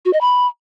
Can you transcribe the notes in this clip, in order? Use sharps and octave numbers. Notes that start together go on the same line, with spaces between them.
F#4
D#5
B5